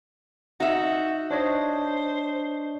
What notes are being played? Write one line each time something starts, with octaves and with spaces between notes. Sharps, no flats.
D#4 F#4 E5
D4 C5 C#5 D#5